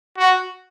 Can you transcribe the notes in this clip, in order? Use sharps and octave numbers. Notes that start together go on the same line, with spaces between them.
F#4